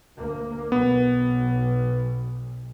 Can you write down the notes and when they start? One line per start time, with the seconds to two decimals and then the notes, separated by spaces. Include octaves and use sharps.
0.18 D2 A#3
0.72 B1 B3